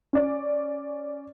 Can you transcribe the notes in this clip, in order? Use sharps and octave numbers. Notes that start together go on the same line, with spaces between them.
C#4 D5